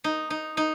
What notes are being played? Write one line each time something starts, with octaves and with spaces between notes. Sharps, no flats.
D#4
D#4
D#4